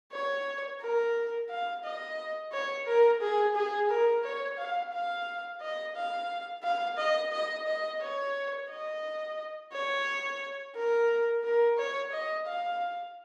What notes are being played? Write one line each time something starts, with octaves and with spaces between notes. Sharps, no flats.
C#5
A#4
F5
D#5
C#5
A#4
G#4
G#4
A#4
C#5
F5
F5
D#5
F5
F5
D#5
D#5
D#5
C#5
D#5
C#5
A#4
A#4
C#5
D#5
F5